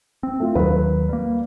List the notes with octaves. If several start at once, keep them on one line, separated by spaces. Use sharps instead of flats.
C4
A3 F4
D#2 D#3 F#3 B4
G3 A#3